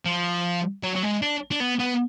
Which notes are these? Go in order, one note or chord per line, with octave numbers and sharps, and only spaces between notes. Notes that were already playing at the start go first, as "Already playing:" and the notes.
F3
F#3
F#3
G#3
D4
D4
B3
B3